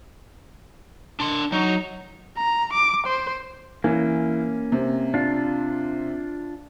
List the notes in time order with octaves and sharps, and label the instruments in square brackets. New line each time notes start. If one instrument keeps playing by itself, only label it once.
[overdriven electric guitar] D4 C6
[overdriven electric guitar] F#3 [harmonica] D#4
[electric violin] A#5
D6
C5
[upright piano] E3 [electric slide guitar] A#3 C#4
[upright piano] C3
[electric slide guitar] D4 F4